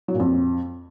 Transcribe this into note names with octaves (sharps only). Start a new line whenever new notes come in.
F#3
A#2
F2